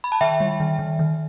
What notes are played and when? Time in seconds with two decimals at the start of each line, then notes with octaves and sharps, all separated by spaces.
0.04 B5
0.12 A5
0.21 D#3 E5 G5
0.40 G3
0.60 D#3
0.79 D#3
0.99 D#3